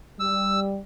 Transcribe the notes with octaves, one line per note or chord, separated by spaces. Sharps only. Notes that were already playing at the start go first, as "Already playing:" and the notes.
G3 E6